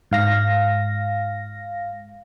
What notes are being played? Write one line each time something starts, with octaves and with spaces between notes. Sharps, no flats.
G#2 F5 A#6